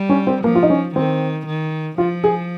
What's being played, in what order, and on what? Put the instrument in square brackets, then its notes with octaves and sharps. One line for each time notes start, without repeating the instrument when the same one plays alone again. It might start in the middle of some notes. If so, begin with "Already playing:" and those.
Already playing: [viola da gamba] G3
[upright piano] C#4
C4
[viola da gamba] F3 [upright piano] A#3
[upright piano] F4
D#4
C#4
[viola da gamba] D#3 [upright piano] C4
[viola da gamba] D#3
[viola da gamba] F3 [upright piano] F4
[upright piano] G#4